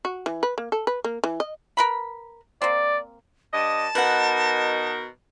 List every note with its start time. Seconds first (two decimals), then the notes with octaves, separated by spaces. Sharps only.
0.05 F#4
0.26 E3
0.43 B4
0.58 A#3
0.72 A4
0.87 B4
1.04 A#3
1.24 E3
1.40 D#5
1.77 A#4 B4 B5
2.62 A#3 C4 D5
3.53 G2 D#5 A5
3.95 B2 D#4 A#4 B4 F#5